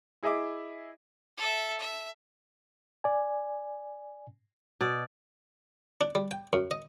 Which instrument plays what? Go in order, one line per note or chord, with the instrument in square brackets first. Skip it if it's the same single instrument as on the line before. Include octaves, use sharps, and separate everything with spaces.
[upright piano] E4 G#4 D#5 E5 D6
[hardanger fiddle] A4 E5
E5
[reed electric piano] D5 G#5
[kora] B2 D5
[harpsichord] D4
G3
G5
F#2
D#5